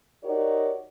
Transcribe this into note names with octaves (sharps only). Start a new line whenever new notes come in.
D#4 F#4 G4 A#4 C#5 D5